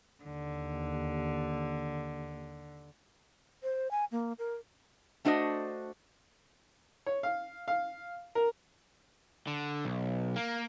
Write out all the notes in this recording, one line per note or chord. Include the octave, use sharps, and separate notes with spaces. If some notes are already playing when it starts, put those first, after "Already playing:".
D#2 D3
C5
G#5
A#3
A#4
A3 D4 F#4 C5 D#5
C#5
F5
F5
A#4
D3
B1
A#3